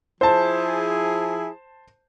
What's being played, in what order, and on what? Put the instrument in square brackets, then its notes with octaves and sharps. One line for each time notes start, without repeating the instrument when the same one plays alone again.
[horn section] F3 E4 G#4 [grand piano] C5 A5